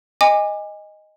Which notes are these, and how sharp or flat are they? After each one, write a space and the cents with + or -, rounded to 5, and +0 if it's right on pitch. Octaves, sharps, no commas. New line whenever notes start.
D#5 +0 G#5 -25 D6 +20